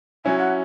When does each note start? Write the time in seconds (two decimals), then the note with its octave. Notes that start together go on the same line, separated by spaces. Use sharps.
0.25 F#3 C#4 E4 G#5
0.38 F#5